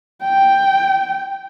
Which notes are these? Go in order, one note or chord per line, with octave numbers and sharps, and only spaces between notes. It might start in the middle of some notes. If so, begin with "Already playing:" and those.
G5